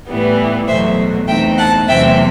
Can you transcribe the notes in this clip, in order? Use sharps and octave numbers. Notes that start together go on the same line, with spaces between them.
A2 E3 G3 B3
E2 B2 F#3 A3 C5 E5
E2 B2 A3 C4 D#4 E5 G5
F#5 A5
E2 C3 F#3 A3 C4 E5 G5